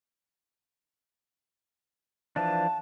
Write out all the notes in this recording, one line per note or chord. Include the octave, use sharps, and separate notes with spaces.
E3 F3 D4 A5